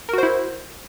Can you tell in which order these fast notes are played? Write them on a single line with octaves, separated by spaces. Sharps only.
A#4 F#4 C5 E4